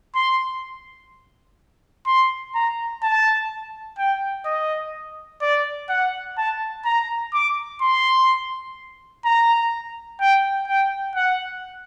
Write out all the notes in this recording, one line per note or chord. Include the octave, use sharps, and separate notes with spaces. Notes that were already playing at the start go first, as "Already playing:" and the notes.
C6
C6
A#5
A5
G5
D#5
D5
F#5
A5
A#5
D6
C6
A#5
G5
G5
F#5